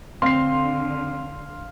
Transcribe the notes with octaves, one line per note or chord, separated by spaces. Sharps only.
D3 C4 F5 C6 C7